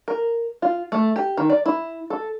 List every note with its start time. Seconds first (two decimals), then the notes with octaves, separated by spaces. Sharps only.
0.08 A#4
0.62 F4
0.92 A3
1.16 G4
1.37 D#3
1.50 D5
1.66 E4
2.10 A4